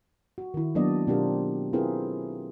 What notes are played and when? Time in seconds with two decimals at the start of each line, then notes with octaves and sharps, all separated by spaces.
0.38 F#4
0.54 D#3 E4
0.75 F#3 A#3 B3 D4 D5 D#5
1.07 B2 C4 D4 F4 G4 A#4
1.73 C4 E4 F4 G#4 A#4 B4